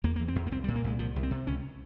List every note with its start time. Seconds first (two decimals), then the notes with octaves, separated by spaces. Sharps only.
0.04 E2 A#3
0.16 E2 A#3
0.28 C4
0.36 E2
0.47 A#3
0.51 C2 C4
0.64 G3
0.68 A#2
0.76 A#3
0.84 C2 G#3
0.99 C2 F3
1.16 C2
1.23 C4
1.31 C3
1.47 C#2 C#4